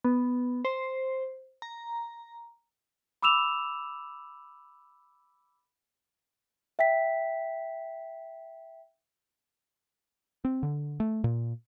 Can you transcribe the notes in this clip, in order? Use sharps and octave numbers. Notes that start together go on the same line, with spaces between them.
B3
C5
A#5
B5 D6 E6 E7 F7
E5 G5 B6
C4
D3
A3
A#2